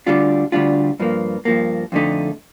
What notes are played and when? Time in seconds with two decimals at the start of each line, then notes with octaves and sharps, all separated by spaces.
0.07 D2 D3 G3 D4 F4
0.52 D2 D3 G3 D4 F4
1.00 G2 F3 A#3
1.45 G2 F3 A#3
1.92 F2 D3 A3 D#4